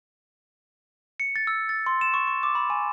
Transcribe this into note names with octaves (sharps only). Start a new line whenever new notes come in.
C#7
A6
E6
A6
C6
E7
C#6
C#6
D6
B5
G#5